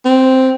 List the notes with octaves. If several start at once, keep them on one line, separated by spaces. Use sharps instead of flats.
C4